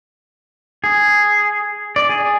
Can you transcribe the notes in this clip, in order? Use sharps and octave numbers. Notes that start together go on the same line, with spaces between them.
G#4
D5
G#4